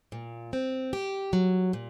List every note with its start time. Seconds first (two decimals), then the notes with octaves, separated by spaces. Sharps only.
0.12 A#2
0.53 C4
0.93 G4
1.33 F#3
1.73 A#2